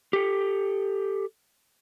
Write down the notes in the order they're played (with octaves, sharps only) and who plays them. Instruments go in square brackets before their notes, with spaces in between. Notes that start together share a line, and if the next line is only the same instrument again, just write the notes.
[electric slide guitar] G4 A4